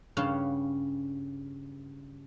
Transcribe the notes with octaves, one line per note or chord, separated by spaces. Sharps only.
G2 C#3 C#4 F5 F#5 A5